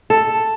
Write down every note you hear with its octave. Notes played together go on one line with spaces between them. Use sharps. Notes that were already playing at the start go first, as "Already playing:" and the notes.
A4